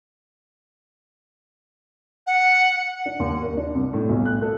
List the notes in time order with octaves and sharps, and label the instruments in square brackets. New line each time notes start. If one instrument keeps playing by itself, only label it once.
[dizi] F#5
[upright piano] D4
D#2
A#4
D4
C2
A2
B1
F#6
A4